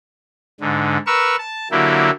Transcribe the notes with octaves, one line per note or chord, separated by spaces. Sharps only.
G#2 D3
A#4 B4 C#6 E6
A5
D3 F#3 A#3 E4 G4